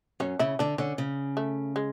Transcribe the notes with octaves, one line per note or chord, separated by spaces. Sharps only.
F#2 C#4
C#3 E4
D3 D4
D3 C#4
C#3
A3
G#3